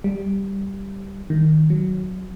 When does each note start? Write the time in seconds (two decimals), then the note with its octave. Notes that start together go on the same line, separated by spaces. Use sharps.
0.04 G3
1.30 D#3
1.70 F#3